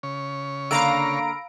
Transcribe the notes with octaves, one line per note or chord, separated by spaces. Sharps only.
C#3 C#5
D3 A#3 F5 A#5 B5 E6 D7